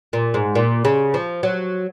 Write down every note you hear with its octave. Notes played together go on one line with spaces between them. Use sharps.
A#2
G#2
A#2
C#3
F3
F#3